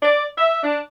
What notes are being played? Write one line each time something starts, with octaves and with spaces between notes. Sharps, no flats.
D5
E5
D4